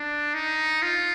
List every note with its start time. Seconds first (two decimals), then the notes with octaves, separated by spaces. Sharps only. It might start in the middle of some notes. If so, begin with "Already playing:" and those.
Already playing: D4
0.34 D#4
0.83 F4